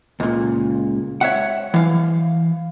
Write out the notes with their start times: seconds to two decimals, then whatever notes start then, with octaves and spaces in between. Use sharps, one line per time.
0.20 C#2 A#2
1.21 C#5 E5 F#5
1.74 E3 F5